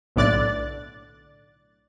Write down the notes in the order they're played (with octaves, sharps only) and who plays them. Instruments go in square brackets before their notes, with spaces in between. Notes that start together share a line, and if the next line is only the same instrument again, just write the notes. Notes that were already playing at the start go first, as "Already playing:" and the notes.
[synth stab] B1 A2 D3 D5 F#6 A6